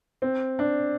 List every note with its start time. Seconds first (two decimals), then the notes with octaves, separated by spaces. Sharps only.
0.22 C4
0.59 D4